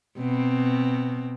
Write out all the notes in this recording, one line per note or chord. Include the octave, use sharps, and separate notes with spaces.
B2 C4